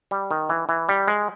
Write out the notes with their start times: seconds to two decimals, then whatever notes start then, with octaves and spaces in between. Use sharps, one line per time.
0.11 G3
0.31 D#3
0.49 E3
0.69 E3
0.89 G3
1.08 G#3